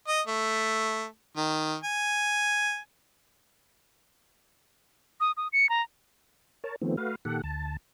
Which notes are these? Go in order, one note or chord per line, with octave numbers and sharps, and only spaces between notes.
D#5
A3
D#3
G#5
D#6
D#6
C#7
A#5
A#4 C#5 A5
D#3 F3 A3 B3 C4
A3 F#4 B4 F5
A#2 D#3 G4 A4 F#5
D2 A5